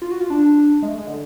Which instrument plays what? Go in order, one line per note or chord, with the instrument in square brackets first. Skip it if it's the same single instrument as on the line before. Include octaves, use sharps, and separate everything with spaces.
[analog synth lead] F4
F#4
F4
D4
G#3
A3
G#3
D3